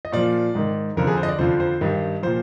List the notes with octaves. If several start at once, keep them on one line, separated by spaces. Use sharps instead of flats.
D#5
A#2 F3 D5
G#2 D#3
F2 D3 F3 A#4
G#4
C5
D#5
D5
F2 D3 F3 C5
C5
G2 D#3
A#2 F3 C5